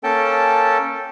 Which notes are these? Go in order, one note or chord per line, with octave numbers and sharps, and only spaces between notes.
A#3 C#4 A4 G5 A5